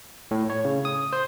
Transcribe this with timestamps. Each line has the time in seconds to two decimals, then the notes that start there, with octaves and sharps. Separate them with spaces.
0.31 A2
0.50 C#5
0.65 C#3
0.85 D#6
1.13 C5